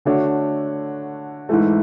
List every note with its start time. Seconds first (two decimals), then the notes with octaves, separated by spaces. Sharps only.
0.05 D3 A3 D4 F#4 C#5
1.49 G#2 E3 A3